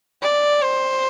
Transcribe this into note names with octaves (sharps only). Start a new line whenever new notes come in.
D5
C5